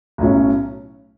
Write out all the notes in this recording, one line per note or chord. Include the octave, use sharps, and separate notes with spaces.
B1 A2 F#3 C#4